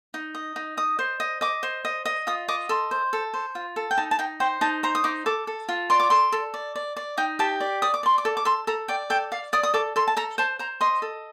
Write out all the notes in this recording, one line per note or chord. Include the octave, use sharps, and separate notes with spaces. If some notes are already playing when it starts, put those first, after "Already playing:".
D#4
D#5
D#4
D#5 D#6
C5
D#5
D#5 D6
C5
D#5
D#5
F4 D#6
D#5 D6
A4 C6
C5
A4
C5
F4
A4
G5
D#4 A5
A5
D#4 G5
C5 G5
D#4 A5
C5 A#5
D#6
D#4 D6
A4 D6
A4
F4
D5 C6
D6
A4 C6
A4
D5
D5
D5
D#4 G5
G4 A5
D5
D5 D#6
D6
D5 C6
D6
A4
D6
A4 C6
A4 A#5
D5 G5
A4 G5
D5 F5
D5 D#6
D#6
A4 D6
A4 C6
A5
A4 A#5
C5 A5
C5 A#5
D#5 C6
A4